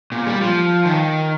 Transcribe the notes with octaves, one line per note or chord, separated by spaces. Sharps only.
A#2
G3
F3
D#3